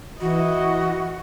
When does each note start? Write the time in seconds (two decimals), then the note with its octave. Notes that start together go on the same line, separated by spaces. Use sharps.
0.21 E3 E4 F#4 D#5